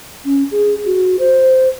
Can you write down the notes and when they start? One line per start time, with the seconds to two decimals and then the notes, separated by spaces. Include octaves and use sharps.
0.25 C#4
0.51 G#4
0.86 F#4
1.19 C5